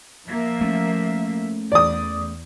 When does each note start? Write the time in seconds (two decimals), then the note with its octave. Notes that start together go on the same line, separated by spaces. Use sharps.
0.28 F3 A#3 E5
0.61 A3 C#4
1.72 E2 D5 D#6